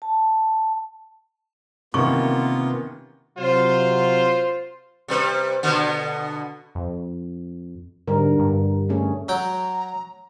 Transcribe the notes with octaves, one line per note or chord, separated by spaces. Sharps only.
A5
C3 D#3 E3 A#3 B3 C#4 F4 C#6
C3 F#3 F4 C5
C3 G3 B4
B2 D3 B3
F2
G#2 D3 G3 A#4
G2
A3 C#4 G#4
F#3 G5 A#5